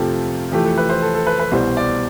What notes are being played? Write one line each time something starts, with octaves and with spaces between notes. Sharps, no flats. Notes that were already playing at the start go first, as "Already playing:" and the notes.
Already playing: F2 C3 F3 A3 F4 G4 A4
F2 E3 A3 G4
A4
B4
C5
A4
A4
B4
B4
C2 B2 G3 C5
D5